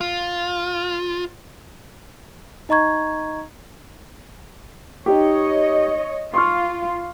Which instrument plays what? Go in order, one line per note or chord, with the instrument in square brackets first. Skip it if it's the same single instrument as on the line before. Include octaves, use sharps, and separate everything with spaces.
[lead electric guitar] F4
[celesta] D#4 D#5 A#5 C#6 G#6
[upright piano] D#4 G4 [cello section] C#5 D#5
[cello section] F4 [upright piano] C6 C#6 F6